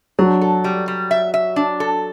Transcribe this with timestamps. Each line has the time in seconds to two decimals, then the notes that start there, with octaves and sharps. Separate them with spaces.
0.19 F#3 D4
0.41 A4
0.64 G3
0.88 G3
1.11 E5
1.34 E5
1.56 D4
1.80 A4